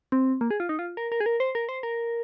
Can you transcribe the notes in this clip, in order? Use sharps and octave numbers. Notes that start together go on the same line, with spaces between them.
C4
A#3
G#4
F4
D#4
F4
A#4
A#4
G#4
A#4
C5
A#4
C5
A#4